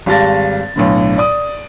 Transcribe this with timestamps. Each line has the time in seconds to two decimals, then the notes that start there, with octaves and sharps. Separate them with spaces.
0.06 G#1 G3 F5 A5 A6 A#6
0.76 B1 A2 D3
1.18 D5 D#6